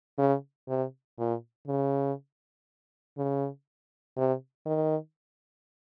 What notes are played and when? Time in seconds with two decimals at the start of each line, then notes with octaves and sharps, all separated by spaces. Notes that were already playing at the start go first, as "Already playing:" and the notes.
0.18 C#3
0.68 C3
1.18 A#2
1.68 C#3
3.17 C#3
4.17 C3
4.66 D#3